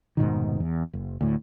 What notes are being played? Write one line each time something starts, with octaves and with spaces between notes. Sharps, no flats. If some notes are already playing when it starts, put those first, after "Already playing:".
F1 G#2 B2 D#3
E2
F#1
D2 A2